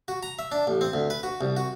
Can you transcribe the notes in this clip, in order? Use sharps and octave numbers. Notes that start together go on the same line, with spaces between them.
F#4
A#5
E5
D4
A1
C4
D2
B4
F#4
C2
F#4